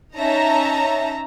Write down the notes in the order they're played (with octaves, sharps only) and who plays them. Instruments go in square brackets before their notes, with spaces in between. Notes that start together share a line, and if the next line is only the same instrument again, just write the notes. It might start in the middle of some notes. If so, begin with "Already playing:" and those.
[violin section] C#4 D#4 E5 A5 A#5